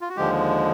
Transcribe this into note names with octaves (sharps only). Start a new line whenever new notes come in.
F4
F#4
D#2 D3 F3 G#3 G4